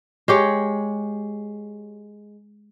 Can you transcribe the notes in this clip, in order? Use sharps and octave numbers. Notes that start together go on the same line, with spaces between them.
G#3 G4 C#5